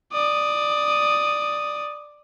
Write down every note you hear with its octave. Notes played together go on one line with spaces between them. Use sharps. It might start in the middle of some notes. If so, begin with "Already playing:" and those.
D5 D#6